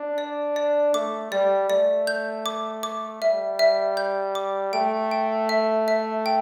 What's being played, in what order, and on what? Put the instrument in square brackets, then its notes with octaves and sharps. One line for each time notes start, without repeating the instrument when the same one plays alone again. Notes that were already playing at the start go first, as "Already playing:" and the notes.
Already playing: [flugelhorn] D4
[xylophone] D5
D5
[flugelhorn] A3 [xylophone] D6
[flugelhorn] G3 [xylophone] D5
[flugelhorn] A3 [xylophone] D5
[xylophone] G6
D6
D6
[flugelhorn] G3 [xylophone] E5
[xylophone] E5
G6
D6
[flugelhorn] A3 [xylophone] G5
[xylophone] G5
E5
E5
G5